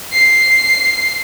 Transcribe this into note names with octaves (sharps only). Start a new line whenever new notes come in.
C7